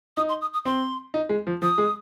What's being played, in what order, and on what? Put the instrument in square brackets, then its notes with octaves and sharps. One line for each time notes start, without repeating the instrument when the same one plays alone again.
[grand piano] D#4 [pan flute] D#6
[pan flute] C6
D#6
D#6
[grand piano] C4 [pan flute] C6
[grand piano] D#4
G#3
F3
[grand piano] F3 [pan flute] D#6
[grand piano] G#3